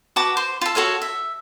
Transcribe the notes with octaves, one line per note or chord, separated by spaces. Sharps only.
F#4 B4 A5 D6
C5
F4 A4
F#4 A4 C#5 F5
E5